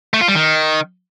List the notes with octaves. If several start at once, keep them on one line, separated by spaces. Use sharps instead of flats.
A3
F4
G3
D#3